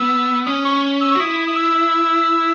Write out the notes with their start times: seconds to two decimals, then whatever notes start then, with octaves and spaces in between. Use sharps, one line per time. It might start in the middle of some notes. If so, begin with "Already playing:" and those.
Already playing: B3 E6
0.46 C#4 D#6
0.65 C#6
1.01 E6
1.11 C#6
1.15 F#4
1.20 E4 D#6
1.47 D#6
1.56 E6